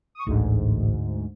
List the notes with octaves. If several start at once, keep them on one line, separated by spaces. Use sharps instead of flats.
C#6 D#6
A1 D2 G#2